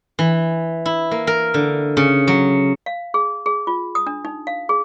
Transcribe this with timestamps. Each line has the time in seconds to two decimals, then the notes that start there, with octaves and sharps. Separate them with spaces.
0.19 E3
0.85 E4
1.11 A#3
1.27 A#4
1.54 D3
1.97 C#3
2.28 F#3
2.86 F5
3.14 G#4
3.46 G#4
3.67 F4
3.95 D#6
4.07 D4
4.25 D#4
4.47 F5
4.69 G#4